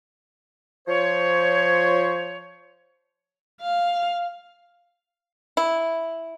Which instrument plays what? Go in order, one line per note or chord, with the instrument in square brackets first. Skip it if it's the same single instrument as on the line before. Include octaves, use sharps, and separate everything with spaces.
[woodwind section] F3 C5 C#5
[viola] F5
[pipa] E4